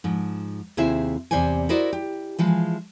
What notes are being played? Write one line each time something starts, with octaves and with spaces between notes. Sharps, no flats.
G#2 F3
D#2 C3 E4 G#4 C5 E5
E2 C3 C5 D5 G#5
E4 F#4 A#4 C5 D5 D#5
G4
E3 F3 G#3